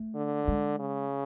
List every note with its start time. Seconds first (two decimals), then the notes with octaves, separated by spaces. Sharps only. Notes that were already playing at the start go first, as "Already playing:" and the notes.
Already playing: A3
0.15 D3
0.48 G#3
0.79 C#3